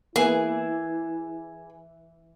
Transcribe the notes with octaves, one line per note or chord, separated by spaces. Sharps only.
E3 A#3 B3 E4 G#4